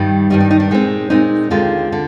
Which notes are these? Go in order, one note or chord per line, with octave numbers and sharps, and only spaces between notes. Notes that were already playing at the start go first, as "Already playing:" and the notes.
Already playing: G2 D#3 G3
G2 D#3 G3 D#4
D#4
D#4
D4
A#2 G#3 C4 D#4
A#2 G#3 C4 D#4
D#2 D3 G#3 C4 F4
D3